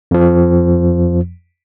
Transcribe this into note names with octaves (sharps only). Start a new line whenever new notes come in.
F2 F3